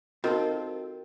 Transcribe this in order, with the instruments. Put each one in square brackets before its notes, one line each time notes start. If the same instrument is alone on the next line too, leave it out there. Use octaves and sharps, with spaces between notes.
[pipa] D#3 [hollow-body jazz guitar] C4 F4 A4 [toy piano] F#4 A#4